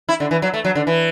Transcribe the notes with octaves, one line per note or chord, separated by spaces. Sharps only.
E4
D3
E3
F#3
A3
F#3
D3
E3